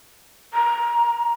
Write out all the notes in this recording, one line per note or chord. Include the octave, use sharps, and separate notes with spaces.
A#5